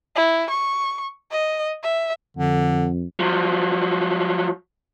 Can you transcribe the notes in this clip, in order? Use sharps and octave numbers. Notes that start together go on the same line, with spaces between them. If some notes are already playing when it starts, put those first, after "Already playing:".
E4
C#6
D#5
E5
F2 D3
F3 F#3